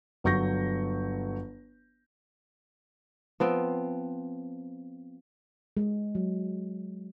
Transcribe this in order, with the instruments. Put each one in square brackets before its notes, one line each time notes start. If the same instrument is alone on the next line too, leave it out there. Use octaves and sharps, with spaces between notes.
[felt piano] G1 F#3 C#6 G6 A#6
[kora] F3 B3 C4
[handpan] G#3
F#3